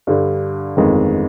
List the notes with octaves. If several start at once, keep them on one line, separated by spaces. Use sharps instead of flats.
G2 D3 G3
G1 F2 D#3 G#3